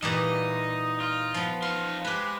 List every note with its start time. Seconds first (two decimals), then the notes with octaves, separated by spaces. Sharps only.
0.02 A#2 E3 G3 D#4 D#5
1.00 F4
1.34 F3 B3
1.62 D#4 F4 C6
2.04 G#3 G4 B4